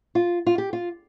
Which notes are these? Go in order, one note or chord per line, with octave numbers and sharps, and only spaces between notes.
F4
F4
G4
F4